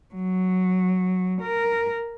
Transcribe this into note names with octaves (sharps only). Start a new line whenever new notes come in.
F#3
A#4